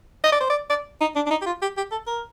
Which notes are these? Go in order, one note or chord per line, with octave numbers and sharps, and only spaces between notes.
D#5
D5
C5
D5
D5
D#4
D4
D4
D#4
G4
F4
G4
G4
A4
A#4